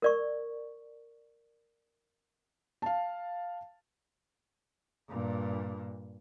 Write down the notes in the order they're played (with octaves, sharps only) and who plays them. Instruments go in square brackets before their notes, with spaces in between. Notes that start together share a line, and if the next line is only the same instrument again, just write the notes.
[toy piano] A#4 D5 C#6
[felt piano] F5 A5
[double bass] G2 A#2